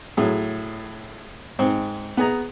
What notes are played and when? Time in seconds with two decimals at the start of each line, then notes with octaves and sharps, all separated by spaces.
0.17 A2 F#3 G#4
1.59 G#2 C4
2.17 B3 G#4 A#5